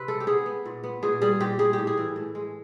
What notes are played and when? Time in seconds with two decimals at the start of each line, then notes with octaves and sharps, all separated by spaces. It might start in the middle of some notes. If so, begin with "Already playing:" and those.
Already playing: C3 B4
0.08 G#3 A4
0.20 G4
0.27 B3 G#4
0.46 B3
0.65 A#2
0.84 B3
1.03 A#2 G#4
1.22 G3 G#4
1.40 A#2 G4
1.59 G3 G#4
1.73 G4
1.78 A2
1.87 G#4
1.98 E3
2.16 A2
2.35 G#3